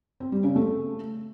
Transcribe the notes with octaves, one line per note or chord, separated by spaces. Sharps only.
C4
G3
C#3
A3